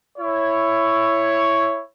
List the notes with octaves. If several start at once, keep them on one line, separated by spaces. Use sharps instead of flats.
E4 C#5